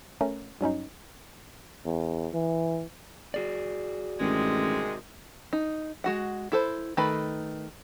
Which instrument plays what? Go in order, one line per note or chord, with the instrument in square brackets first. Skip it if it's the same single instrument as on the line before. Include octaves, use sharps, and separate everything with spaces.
[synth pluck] A3 C#4 A#4
G2 F#3 C#4 D#4
[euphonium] E2
E3
[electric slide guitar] F#4 G#4 D5
[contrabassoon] A1 [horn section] C3 D#3 G#3
[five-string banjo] D#4
G#3 F#4 F#5
E4 A4 C5
D#3 A3 A4 B4 B5